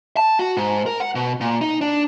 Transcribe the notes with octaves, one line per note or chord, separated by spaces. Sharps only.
A5
F#4
G#2
A#4
F#5
B2
A#2
D#4
D4